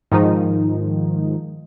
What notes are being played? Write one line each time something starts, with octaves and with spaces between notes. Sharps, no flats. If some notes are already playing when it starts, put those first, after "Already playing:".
G#2 D#3 F3 D#4